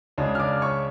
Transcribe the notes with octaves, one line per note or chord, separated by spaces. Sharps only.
C#2 C#3 G#3 D4
F6
D5 D6
C#5 C#6